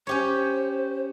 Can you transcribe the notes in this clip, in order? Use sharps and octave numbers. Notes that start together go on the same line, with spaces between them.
C#4 G4 C5 C#5